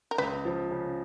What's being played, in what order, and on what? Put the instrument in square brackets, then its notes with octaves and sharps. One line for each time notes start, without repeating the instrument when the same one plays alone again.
[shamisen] A#4
[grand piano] C#2 [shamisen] B4
[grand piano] F3
C#3